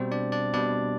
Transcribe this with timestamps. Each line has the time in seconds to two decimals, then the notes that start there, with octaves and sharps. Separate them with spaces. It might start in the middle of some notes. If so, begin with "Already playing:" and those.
Already playing: B2 G3 C4 C5
0.12 D4 D5
0.32 D4 D5
0.54 B2 G3 D4 D5